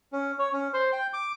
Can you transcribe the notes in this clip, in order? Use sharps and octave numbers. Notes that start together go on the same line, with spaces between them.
C#4
C#5
C#4
C5
G5
D6